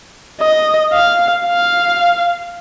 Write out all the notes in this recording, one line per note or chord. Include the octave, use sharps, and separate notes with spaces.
D#5
F5
F5